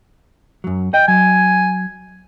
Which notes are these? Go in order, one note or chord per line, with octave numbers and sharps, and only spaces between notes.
F#2 F#3
D#5 G5
F#3 G#5